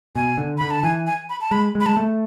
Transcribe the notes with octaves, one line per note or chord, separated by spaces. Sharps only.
B2 G#5
D3
D3 B5
A5
E3 G#5
G#5
B5
A5
G#3 B5
G#3
B5
G#3 A5
A3